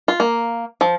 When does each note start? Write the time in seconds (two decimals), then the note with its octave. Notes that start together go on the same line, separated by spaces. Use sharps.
0.08 F4
0.20 A#3
0.81 F3